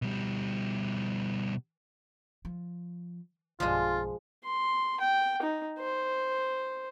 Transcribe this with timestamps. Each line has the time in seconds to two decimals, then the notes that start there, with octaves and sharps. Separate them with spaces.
0.02 B2 G3
2.45 F3
3.60 B1 G2 F3 G#3 F4
4.45 C6
5.00 G5
5.42 D#4
5.79 C5